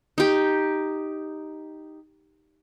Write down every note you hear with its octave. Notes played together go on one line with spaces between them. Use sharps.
D#4 G4